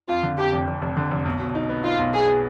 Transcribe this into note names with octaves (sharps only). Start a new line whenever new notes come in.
F2 F4
D3
F2 G4
F1
F1
F1
D3
F1
B1
B2
D#4
B3
D#4 F4
B1
B3 G#4
B3